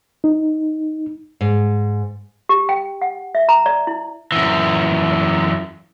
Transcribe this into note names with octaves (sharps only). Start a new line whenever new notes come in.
D#4
G#2
G4
G5
F#5
E5
A#5
D5
E4
F#2 E3